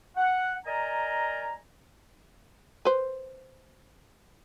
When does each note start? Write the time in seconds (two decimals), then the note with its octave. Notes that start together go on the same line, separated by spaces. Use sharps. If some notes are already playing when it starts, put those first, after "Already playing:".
0.17 F#5
0.65 A#4 D5 D#5 G#5 A#5
2.85 B4 C5